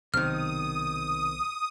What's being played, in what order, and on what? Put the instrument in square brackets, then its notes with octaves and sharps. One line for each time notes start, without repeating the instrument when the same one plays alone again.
[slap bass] B1 [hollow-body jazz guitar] C3 D#3 [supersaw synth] D#6 [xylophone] F6